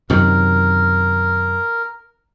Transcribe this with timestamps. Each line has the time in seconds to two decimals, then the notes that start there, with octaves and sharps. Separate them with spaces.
0.10 F#2 C3 D#3 A#4